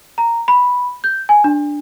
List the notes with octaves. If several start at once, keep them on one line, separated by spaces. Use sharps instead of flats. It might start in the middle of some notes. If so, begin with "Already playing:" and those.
A#5
B5
G6
G#5
D4